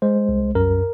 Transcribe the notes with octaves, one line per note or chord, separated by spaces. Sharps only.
G#3 C5
C2
F#2 A#4